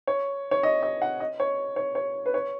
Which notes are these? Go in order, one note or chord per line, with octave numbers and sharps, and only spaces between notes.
C#5
C#5
D#5
D#5
F#5
D#5
C#5
C#5
C#5
B4
C#5